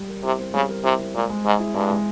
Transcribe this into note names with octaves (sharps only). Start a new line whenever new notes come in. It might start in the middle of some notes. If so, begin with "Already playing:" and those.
Already playing: G3
A#4
C3 E4
C4
C#3 G3
A#4
C3 E4
C4
A#2 G#3
G#3
G#2 G#4
E4
G2 G#3
G#3